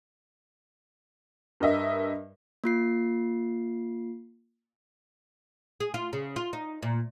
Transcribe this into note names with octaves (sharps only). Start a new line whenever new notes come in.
G2 A#4 D#5 E5
A#3 F4 C7
G#4
F4
C#3
F4
D#4
A#2